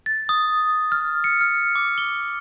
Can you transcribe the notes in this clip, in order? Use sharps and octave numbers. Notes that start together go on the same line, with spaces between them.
A6
D#6
F6
C#7
F6
D6
G7